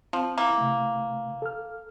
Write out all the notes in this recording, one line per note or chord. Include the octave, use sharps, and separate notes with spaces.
F3 C4
E3 A#3
C3 A3
A4 F6